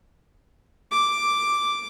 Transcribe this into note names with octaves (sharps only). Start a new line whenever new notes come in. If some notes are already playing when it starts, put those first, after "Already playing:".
D6